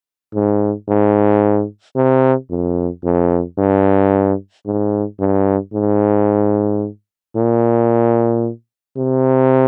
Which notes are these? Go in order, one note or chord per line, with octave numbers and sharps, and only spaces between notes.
G#2
G#2
C3
F2
F2
G2
G#2
G2
G#2
A#2
C3